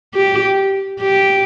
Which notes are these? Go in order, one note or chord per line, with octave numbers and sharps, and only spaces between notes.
G4
G4